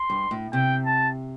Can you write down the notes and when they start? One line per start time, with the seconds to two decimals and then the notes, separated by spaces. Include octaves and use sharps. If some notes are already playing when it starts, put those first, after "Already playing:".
Already playing: C6
0.10 G2
0.31 A2
0.53 C3 G5
0.86 A5